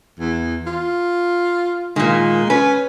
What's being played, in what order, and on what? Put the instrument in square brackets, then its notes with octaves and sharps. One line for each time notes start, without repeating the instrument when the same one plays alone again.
[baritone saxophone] E2
F4
[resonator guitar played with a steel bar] A#2 D#3 [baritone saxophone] G#3
[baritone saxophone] C#4 [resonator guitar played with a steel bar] B4